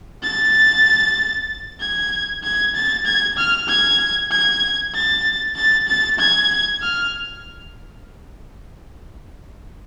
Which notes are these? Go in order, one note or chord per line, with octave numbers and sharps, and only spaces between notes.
A6
G#6
G#6
A6
G#6
F6
G#6
G#6
A6
A6
A6
G#6
F6